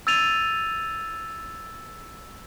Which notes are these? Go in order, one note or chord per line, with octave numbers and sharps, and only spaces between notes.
E6 G#6 A6 D#7 F7